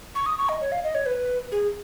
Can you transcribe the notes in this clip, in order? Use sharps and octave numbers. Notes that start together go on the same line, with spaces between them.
C#6
D#6
C#6
D#5
C#5
F5
D#5
C#5
B4
G#4